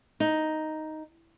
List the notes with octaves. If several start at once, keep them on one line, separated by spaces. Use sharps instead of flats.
D#4